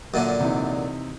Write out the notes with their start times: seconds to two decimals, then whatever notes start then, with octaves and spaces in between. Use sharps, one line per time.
0.14 F#2 A#2 D3
0.40 C3 E3 D#4